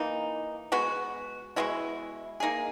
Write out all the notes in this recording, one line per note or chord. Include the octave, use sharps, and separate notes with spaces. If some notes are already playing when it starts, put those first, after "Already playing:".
Already playing: E3 A#3 D#4
G#3 B3 F#4
B2 G#3 B3 E4
A#3 D#4 G#4